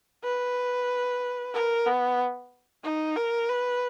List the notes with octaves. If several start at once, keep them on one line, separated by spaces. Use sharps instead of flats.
B4
A#4
B3
D#4
A#4
B4